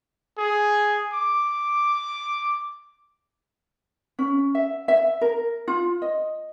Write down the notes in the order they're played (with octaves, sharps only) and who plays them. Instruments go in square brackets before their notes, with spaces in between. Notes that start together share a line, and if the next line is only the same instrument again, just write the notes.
[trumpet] G#4
D6
[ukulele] C#4
E5
E5
A#4
F4
D#5